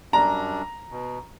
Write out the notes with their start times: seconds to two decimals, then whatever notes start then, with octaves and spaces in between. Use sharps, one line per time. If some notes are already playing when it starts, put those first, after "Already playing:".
0.13 F#2 G3 D4 A#5
0.91 B2